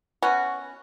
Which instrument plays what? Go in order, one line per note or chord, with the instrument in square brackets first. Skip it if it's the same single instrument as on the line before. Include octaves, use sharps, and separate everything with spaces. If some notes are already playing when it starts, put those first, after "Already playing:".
[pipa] B3 C#4 F#4